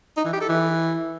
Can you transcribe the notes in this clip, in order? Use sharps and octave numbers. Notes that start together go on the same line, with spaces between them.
D#4
E3
G4
A4
E3